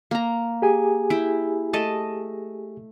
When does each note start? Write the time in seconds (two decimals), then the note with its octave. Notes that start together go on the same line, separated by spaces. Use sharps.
0.11 A#3 A#5
0.62 G4 G#4 G#5
1.10 E4 G5
1.73 A3 D#5 A5